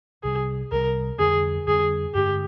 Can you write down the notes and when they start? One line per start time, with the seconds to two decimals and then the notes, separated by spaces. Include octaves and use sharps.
0.23 C2 C3 G3 G#4
0.71 C2 C3 G3 A#4
1.18 F2 D3 G3 C4 G#4
1.67 F2 D3 G3 C4 G#4
2.14 G2 D3 G#3 D4 G4